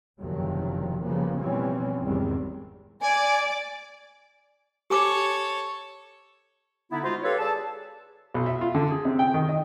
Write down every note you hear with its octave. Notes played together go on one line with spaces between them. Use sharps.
F#1 E2 C3 D#3 F3 F#3
C#3 F3 G3 A#3 B3
B2 E3 F3 G3 C4 C#4
G#1 E2 D#3 G3 G#3 C4
D5 G#5 D6
G4 A4 C#5 G#5 D6
D3 B3 D#4 E4
G#3 D#4 F4 F#4 C5
G4 A4 B4 C#5 F5
G#4 A4 D5 A5
B1
E5
F4
D3
G#4
C3
G5
D#3
D#5